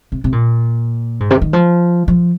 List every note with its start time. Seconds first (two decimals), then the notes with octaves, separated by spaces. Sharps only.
0.12 C3
0.24 C3
0.32 A#2
1.20 G#2
1.31 C3
1.42 D#3
1.53 F3
2.08 F3